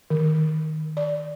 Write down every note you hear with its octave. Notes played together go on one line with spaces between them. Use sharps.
D#3
D5